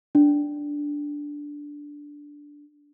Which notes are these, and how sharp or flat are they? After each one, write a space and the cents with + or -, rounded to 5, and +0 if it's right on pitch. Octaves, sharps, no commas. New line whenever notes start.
D4 -5